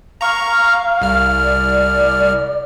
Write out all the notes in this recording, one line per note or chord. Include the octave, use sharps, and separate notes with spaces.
F5 A#5 C#6
C2 F6
D5